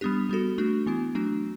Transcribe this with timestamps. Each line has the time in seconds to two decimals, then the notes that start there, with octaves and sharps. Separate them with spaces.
0.01 G3 B3 D4 G4
0.29 G3 B3 F#4 A4
0.58 A3 D4 F#4
0.86 E3 B3 E4
1.15 F#3 A3 D4 F#4